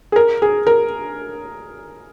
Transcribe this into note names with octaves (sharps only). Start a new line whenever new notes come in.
G#4
A#4
G#4
A#4